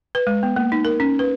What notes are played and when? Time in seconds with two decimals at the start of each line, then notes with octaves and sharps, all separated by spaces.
0.15 B4
0.27 G#3
0.43 B3
0.56 A#3
0.72 D#4
0.85 A#4
1.00 C#4
1.19 B4